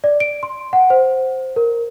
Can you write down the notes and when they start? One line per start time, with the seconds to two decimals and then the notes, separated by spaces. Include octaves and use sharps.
0.04 D5
0.20 D7
0.43 C6
0.73 F#5
0.90 C5
1.56 A#4